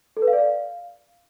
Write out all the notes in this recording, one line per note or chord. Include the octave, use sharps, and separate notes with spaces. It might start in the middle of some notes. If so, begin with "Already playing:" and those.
A4
B4
F5
D5
F5